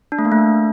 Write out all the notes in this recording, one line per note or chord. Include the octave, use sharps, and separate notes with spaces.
D4
A3
A#3
A3
D4